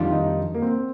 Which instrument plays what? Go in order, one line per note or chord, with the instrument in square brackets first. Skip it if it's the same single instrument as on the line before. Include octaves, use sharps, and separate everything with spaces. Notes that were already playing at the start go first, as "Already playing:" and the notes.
Already playing: [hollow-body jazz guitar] F2 D#3 G3 D4 F4
[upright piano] D#4
A#3
C4